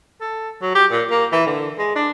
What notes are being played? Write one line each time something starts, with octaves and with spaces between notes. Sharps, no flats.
A4
F#3
G4
A#2
A#3
E3
D3
G#3
D4